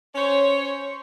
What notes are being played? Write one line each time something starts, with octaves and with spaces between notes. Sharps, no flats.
C#4 C5 C#5